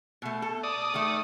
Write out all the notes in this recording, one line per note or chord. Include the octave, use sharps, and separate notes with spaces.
B2 A3
A4
D5 D#6
D#3 A3